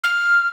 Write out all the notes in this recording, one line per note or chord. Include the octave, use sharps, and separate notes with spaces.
F6